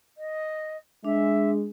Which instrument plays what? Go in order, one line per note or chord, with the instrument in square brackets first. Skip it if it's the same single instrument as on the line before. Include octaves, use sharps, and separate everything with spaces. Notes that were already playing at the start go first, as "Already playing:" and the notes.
[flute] D#5
[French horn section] G#3 [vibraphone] D4 [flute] E5